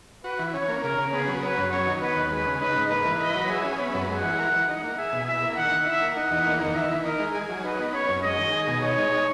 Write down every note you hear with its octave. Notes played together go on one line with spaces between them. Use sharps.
F#4 B4
E3
C#4 C#5
A#3
C#3 A#4
C#3
B3 G#4
F#3
C#4 B4
F#2
F#3 C#5
D#3
B3 B4
D#2
G#3 B4
C#3
D#4 B4
G#2
A#3 B4
E3
B4 D#5
F#3
G#4 E5
C#4
B3 E5
F#2
G#3 F#5
E3
A#4
E3
D#4
A#3
G#4 E5
B2
E4 E5
A#3
D#3 F#5
D#3
E4 E5
A#3
D#4 F#5
E2
A#3
D#3
E3 E5
E3
D#4 A#4
G#3
G#4
F#3
D#4 B4
B3
C#4 C#5
F#2
G#3 D#5
D#3
G#4
B2
D#4 C#5
G#3
D#4